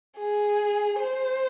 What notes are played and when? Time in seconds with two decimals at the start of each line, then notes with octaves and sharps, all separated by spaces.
0.19 G#4
1.00 C5